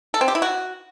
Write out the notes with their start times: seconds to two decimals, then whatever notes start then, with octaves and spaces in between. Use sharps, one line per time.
0.14 A4
0.21 C4
0.28 G4
0.35 E4
0.42 F#4